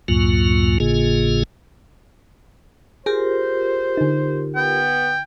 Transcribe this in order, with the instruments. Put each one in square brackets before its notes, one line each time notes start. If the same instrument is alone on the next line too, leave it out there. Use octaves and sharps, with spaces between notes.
[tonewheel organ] C#2 F#2 A2 F#3 A#3 F4
G#1 A2 C#3 A#3 F4 G#4
[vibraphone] F4 G4 A#4 [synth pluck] G#4 [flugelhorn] C5
[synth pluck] D3 D#4
[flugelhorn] B3 [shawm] G5